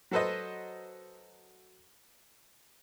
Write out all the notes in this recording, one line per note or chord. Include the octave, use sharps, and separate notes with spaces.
F#3 F#4 A4 B4 C5 D#5